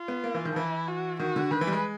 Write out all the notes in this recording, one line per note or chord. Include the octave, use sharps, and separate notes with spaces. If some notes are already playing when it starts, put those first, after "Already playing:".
Already playing: F4
B3
A#3
E3
D#3
F3
E3 E4
F#4
D#3 F#4
D3
D#3 B4
E3
G3
G#3